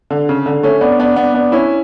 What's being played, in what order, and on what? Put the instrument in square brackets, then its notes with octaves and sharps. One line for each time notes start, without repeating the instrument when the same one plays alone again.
[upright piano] D3
C#3
D3
A3 C#4
B3 D4
B3 D4
B3 D4
B3 D4
C#4 E4